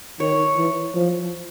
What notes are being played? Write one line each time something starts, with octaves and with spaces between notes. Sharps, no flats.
D#3 C#5
E3
F3